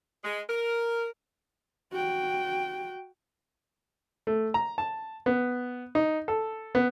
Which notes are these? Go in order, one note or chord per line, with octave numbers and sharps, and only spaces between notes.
G#3
A#4
F#4 G5
A3
A#5
A5
B3
D#4
A4
B3